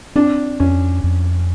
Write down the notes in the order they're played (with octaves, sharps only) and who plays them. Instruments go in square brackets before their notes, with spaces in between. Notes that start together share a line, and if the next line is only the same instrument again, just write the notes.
[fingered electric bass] C4 [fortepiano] D4
[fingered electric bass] F2 [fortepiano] C#4
[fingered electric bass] F2